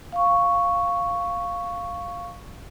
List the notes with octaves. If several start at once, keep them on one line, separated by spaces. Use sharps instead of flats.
F5 C#6